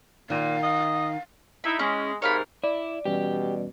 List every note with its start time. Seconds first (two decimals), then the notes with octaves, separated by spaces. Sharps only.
0.30 A#2 D#3 F5
0.63 D#5
1.64 D#4 E4 B5
1.79 G#3 C#4 E4
2.22 G#2 C3 A#4 C#5 F5 B5
2.64 E4 D5
3.05 B2 E3 G3 C#4 G4